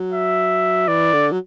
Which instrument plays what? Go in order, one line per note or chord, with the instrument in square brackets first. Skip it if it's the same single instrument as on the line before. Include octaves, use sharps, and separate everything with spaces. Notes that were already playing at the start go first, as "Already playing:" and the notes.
Already playing: [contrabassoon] F#3
[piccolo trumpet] E5
[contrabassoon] E3 [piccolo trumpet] D5
[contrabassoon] D3
F#3